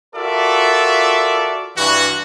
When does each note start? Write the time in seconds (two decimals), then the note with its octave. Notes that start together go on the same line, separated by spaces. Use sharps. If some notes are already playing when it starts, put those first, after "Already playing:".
0.15 F4 F#4 A4 A#4 D5 E5
1.76 G2 E3 F#4